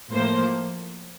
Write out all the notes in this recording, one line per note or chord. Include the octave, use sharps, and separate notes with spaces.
A2 F3 A#3 C5